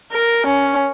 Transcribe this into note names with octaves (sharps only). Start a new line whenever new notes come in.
A#4
C#4